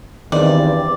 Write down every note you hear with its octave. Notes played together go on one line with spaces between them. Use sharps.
E2 G2 C3 D#3 C4 D5